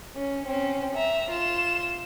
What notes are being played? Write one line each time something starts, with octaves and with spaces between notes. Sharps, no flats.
C#4
C4 C#4
E5 A#5
F4 E7